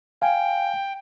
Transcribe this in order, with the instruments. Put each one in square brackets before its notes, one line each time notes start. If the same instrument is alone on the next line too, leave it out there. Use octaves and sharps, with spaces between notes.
[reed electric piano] F5 G#5 [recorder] G5